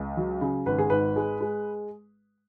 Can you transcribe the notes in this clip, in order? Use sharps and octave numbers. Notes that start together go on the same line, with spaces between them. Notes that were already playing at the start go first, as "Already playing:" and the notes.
Already playing: C#2
F#3
C#3
G#1 B4
G#4
G#2 B4
G#3
G#3